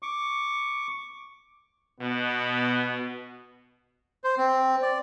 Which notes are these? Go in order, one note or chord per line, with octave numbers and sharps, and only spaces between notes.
C#6 D6
B2 B3
C5
C4
D5